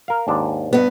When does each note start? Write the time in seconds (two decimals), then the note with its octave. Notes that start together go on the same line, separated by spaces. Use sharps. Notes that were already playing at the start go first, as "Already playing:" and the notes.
0.08 A#4 F5
0.28 D#2 G#2 D4
0.73 G2 B3